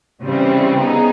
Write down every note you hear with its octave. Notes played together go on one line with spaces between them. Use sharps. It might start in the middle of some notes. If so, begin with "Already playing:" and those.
C#3 E3 G3 C4
B3 D#4 G#4